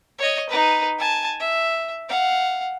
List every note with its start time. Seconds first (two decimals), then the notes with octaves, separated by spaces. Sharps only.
0.18 C#5 D#5
0.49 D#4 B4
0.99 G#5 A5
1.39 E5
2.09 F5 F#5